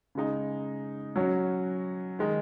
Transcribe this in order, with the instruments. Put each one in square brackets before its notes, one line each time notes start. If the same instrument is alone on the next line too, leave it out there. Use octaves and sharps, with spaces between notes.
[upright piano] C#3 G#3 D#4
F#3 C#4 F#4 C#5
D#3 G#3 D#4